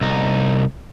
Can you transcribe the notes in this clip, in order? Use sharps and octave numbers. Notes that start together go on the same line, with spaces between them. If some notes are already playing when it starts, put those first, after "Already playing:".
C2 D#4